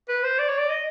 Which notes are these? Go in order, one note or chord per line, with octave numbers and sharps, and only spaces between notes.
B4
C5
D5
C#5
D5
D#5